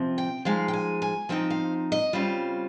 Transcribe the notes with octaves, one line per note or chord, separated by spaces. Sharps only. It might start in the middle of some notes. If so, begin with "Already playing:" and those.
Already playing: C3 F3 C4
G5
F3 G#3 D#4 F5
G5
G#5
G#5
F3 C4 D#4 G5
F5
D#5
C#3 G3 C4 F4 F5